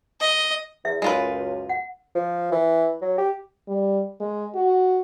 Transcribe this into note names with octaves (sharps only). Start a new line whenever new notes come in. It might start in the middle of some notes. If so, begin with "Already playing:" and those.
D#5
E2 E5
C#2 F#2 G#3 F4 B4
F#5
F3
E3
F#3
G4
G3
G#3
F#4